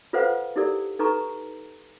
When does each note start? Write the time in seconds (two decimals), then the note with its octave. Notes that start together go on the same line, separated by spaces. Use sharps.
0.13 F4 A4 B4 C5 F5 F#5
0.56 D#4 E4 G4 A4 A#4 D5
0.99 D#4 A4 B4 A5 A#5 C#6